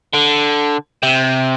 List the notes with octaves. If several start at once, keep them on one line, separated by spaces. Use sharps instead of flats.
D3
C3